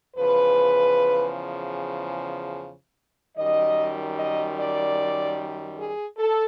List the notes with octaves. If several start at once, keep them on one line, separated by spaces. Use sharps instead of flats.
E2 C#3 F3 B4
F#2 D#3 G3 D#5
D#5
D5
G#4
A4